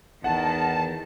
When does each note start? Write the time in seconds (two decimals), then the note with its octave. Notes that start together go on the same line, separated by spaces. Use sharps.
0.24 E2 D#3 F#5 A5